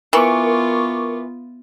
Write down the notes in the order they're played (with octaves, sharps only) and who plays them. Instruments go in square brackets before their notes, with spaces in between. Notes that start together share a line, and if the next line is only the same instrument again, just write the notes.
[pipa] E3 [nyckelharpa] B3 F4 [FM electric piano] A#4 C#6 D6